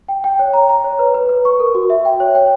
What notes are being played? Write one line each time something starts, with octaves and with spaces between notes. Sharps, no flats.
G5
G5
C#5
A#5
A#5
C#5
B4
B4
B4
C#6
A#4
F#4
E5
G5
C#5
G5